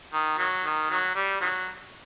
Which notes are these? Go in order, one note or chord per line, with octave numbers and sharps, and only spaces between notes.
D#3
D#3 F#3
D#3
D#3 F#3
G3
D#3 F#3